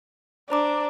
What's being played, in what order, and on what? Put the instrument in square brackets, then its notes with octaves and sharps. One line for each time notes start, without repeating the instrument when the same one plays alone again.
[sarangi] D4 [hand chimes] C5 A#5 D6